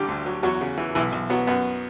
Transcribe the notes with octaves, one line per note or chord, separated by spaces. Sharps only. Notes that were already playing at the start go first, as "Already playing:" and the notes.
Already playing: A1 D3 G3 G4
D2
F#3
E2 F#3 F#4
C#3
E3
B1 E3 E4
B1
F#3 B3
F#2 B3